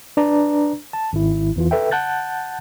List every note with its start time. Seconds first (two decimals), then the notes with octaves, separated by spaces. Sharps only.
0.17 D4 B4 D5 A#5
0.93 A5
1.13 G#1 E4
1.56 E2 E3 F4
1.71 A4 B4 E5 G5
1.91 F#5 A5 F#6 G6 A6